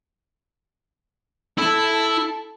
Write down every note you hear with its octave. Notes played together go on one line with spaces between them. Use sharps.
E4 A4 A5